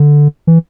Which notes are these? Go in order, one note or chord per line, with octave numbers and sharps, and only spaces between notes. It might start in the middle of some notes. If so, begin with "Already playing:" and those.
Already playing: D3
E3